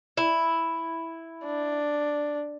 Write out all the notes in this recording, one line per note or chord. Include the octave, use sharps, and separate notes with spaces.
E4
D4